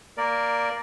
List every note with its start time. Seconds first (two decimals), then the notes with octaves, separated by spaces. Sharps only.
0.18 A#3 A#4 D5